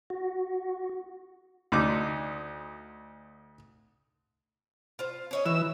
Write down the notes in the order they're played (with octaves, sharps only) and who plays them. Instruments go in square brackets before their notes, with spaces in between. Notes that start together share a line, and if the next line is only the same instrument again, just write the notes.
[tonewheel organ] F#4
[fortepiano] D2 D#4 D6
[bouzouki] F4 C5
C#4 C#5 D#5
[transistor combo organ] E3 E6 [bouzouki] F#4